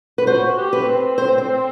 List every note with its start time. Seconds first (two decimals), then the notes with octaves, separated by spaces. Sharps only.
0.18 B4
0.27 F#4 C5
0.57 G4
0.73 B4
0.87 C4
1.18 C5
1.38 C5